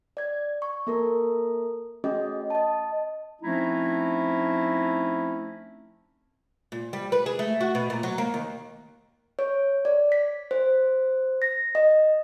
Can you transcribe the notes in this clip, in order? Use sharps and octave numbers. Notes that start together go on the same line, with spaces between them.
D5 G#6
C#6
A#3 A4 A#4
A3 C#4 F#4 G#4 D#5
D#5 A5
F3 A3 C4 C#4 D#4 E4
A#2
G3
B4
G#4
A3
F#4
B2
A#2
F#3
A#3
D#2
C#5
D5
B6
C5
A#6
D#5